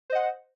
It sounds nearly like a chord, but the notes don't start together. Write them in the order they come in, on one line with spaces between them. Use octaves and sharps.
C5 D#5 F#5